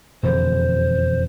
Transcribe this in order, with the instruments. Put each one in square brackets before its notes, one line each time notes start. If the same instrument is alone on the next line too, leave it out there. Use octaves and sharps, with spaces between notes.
[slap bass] E1 F2 D3 [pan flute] C5